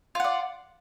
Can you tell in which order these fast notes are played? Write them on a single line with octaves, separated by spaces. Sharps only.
F4 F#5 D5